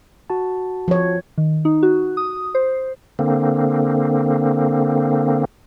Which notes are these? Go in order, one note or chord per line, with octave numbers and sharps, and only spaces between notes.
F#4 A5
F3 C#5
D#3
D#4
F#4
D#6
C5
D3 A#3 C4